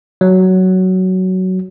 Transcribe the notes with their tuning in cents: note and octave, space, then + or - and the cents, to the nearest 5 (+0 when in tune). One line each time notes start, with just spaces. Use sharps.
F#3 +10